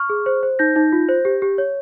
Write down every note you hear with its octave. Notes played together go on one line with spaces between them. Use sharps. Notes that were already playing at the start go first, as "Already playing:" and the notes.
Already playing: C#6 F6
G#4
C5
C5
D#4 G6 A#6
D#4
F4
C5
G4
G4
C#5